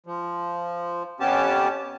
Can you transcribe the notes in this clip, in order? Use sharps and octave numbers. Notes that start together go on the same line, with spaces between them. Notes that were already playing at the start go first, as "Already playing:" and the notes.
F3
F2 B3 C#4 G4 A5